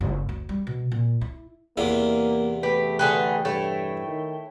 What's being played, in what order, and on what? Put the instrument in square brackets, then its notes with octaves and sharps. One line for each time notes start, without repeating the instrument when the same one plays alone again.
[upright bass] F#1
D2
G3
B2
A#2
E4
[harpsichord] E2 C3 [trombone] A#3
[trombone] A3 [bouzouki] G4 [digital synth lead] B4
[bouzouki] D3 G#4 B4 [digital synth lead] G5
[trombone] G2 [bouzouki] A3 E4 C#5
[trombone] D#3